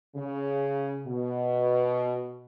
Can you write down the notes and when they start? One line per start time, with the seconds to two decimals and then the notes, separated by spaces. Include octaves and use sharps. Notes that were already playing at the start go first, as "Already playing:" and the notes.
0.16 C#3
1.07 B2